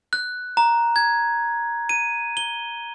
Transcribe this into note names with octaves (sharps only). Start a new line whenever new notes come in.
F#6
A#5
G#6
D#7
G7